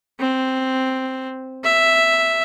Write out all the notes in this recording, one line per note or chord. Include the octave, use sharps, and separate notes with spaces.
C4
E5